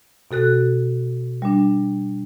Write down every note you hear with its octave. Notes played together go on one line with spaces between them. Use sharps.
B2 F#4 A4 F#6
G3 D4